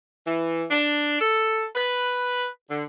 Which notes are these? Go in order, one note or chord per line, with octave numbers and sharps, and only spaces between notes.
E3
D4
A4
B4
D3